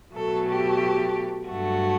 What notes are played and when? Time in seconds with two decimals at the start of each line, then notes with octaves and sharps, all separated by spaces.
0.15 B2 F#3 A3 A4
0.48 G4
1.48 G2 F#3 A3 F#4